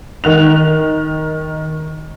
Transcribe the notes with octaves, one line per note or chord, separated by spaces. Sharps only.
D#3 F#6 F7